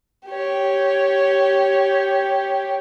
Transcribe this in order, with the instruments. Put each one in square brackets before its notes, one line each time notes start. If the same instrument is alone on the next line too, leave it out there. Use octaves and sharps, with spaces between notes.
[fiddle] G4 C#5